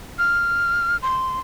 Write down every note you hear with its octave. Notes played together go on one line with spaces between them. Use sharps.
F6
C6